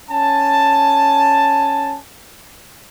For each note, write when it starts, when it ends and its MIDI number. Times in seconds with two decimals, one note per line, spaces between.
0.11 1.98 61
0.11 1.98 80
0.11 1.98 81